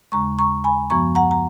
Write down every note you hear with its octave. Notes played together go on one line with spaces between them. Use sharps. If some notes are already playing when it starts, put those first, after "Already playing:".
D#2 C#3 G#3 A#5 C#6
A#5 C#6
G#5 B5
F#2 F3 B3 A#5 C#6
F#5 A#5
A#5